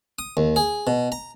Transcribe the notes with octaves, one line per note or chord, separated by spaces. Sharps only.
D#6
D#2
G#4
B2
A#5